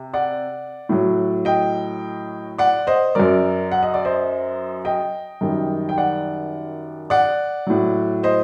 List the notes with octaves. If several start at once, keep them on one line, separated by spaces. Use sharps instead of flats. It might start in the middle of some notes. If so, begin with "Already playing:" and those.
Already playing: C3
D5 F#5
A2 F#3
D#5 G5
D5 F#5
C5 D#5
F#2 F#3 A#4 D5
F#5
D#5
D5
C5 D#5
D#5 G5
F#2 D#3 G3
G5
D5 F#5
D5 F#5
A2 F#3
C5 D#5